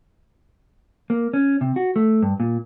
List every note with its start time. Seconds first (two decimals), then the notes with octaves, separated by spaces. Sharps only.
1.10 A#3
1.34 C#4
1.61 C3
1.76 F#4
1.96 A3
2.23 G2
2.40 A#2